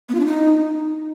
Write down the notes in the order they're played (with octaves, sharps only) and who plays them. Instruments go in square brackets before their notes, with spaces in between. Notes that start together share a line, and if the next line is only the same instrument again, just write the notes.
[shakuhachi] B3
F4
D4
D#4